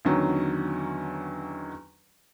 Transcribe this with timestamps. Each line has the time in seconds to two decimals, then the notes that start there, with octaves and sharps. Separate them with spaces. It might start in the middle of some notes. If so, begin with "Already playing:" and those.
0.05 E2 D3 D#3 F#3 C#4 D#4